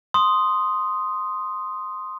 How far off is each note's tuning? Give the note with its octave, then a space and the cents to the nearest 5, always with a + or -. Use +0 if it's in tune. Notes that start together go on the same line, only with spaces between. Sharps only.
C6 +0 D#6 +0